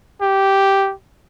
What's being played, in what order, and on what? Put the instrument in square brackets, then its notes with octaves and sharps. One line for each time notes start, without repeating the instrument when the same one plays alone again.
[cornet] G4